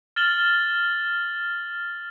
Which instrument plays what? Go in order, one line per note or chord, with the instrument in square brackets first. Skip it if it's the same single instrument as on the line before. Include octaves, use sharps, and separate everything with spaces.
[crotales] F6 A6 E7 F#7 G7